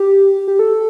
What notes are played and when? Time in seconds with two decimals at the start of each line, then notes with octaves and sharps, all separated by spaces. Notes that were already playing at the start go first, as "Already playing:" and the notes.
Already playing: G4
0.48 G4
0.59 A4